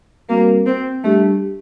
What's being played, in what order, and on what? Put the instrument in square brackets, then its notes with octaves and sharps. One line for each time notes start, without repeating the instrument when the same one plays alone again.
[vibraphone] G3 C4 F#4 A#4 [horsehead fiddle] A#3
[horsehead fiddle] C4
[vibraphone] G3 D4 G4 [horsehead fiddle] A3